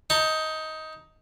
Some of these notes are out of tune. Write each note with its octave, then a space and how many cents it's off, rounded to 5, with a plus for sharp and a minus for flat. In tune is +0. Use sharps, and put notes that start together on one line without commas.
D#4 +15 A5 +40